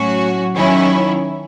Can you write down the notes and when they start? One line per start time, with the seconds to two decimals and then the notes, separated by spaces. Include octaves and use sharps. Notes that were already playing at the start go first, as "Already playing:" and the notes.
Already playing: A2 F#3 C#4 F#4
0.56 D#3 F#3 C#4 E4